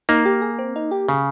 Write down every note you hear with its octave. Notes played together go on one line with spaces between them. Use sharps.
A#3 D#4
G4
G#4
C4
D#4
G4
C#3